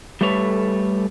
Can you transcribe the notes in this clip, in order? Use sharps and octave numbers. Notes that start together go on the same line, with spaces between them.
G3 A3 A4 B4 C#5